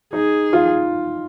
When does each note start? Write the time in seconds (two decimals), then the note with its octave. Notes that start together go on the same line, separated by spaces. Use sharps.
0.13 D#4 G#4
0.53 F4